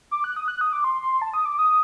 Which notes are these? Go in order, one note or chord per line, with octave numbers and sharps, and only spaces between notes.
D6
F#6
D#6
F#6
D#6
D6
C6
C6
A5
D#6
D6
D#6